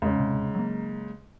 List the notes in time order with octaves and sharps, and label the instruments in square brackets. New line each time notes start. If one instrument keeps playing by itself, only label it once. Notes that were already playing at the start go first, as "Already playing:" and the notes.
[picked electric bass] E2 [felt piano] G#2 C#3
[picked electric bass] D#1 C3
F#3 A#3